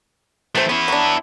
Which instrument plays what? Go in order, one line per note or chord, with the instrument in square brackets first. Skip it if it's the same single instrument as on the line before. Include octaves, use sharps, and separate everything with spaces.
[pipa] C3 C5 [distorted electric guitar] E3 A3
[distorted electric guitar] B3 E4 [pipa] C#4
[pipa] F#3 D4